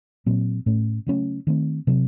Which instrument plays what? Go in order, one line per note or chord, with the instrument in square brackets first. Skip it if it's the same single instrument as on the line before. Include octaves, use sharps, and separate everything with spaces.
[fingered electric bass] A#2 F#3 C4
A2 A3 C#4
C#3 F#3 A3 C#4
D#3 A3 C4
C3 F#3 C4